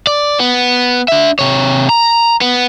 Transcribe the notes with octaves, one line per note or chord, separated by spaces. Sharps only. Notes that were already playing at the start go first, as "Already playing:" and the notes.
D5
B3
D4 E5
C3 C#5
A#5
B3